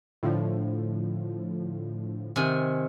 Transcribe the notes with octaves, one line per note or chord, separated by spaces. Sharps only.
A2 D3 F3
C3 D#3 G#5